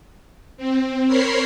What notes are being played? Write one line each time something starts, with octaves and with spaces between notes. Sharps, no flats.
C4
A#4 C5 C#5 B5 C6